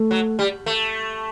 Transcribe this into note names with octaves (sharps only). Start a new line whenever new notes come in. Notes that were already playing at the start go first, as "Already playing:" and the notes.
Already playing: A3
F#3
G3
A3